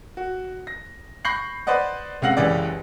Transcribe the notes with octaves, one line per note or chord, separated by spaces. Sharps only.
F#4
A#6
B5 C#6 G6 A#6 C7 F#7
B4 C5 D5 D#5 F#5
C#2 C3 F5 F#5 A#6 F#7
F#1 C#2 E3 G4 D5